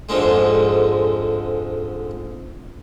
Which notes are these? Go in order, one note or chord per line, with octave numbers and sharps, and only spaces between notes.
F2 G#2 D3 G#3